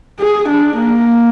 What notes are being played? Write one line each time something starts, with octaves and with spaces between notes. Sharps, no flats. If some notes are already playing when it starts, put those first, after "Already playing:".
G#4
D4
A#3